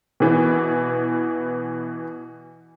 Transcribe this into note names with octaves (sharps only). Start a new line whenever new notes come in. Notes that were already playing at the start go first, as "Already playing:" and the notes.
B2 E3 B3